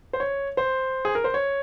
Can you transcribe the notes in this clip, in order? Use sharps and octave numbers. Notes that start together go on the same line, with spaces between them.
C5
C#5
C5
G#4
A#4
C5
C#5